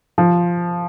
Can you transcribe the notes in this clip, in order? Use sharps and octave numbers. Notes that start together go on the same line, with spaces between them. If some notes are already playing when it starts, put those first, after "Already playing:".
F3